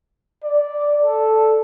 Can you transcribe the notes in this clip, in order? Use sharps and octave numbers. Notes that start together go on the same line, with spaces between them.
D5
A4